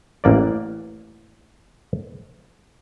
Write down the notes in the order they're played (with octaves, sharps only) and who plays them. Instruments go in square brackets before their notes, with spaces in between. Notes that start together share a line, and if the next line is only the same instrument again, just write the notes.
[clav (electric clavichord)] A1 A#3 D5